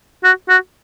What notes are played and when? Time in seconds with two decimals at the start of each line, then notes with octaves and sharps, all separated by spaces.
0.24 F#4
0.49 F#4